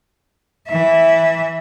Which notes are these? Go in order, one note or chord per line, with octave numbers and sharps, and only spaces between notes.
E3 E5